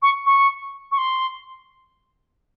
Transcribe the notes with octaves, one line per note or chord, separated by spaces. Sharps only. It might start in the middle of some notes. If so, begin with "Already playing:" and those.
C#6
C#6
C#6
C6